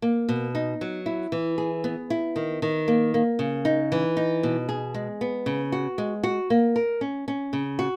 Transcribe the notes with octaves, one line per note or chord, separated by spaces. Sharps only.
A#3
B2
D#4
F#3
E4
E3
G#4
B3
E4
D#3
D#3
A#3
A#3
C#3
D#4
E3
D#4
B2
G#4
G#3
B3
C#3
F#4
G#3
F#4
A#3
A#4
C#4
C#4
C#3
F#4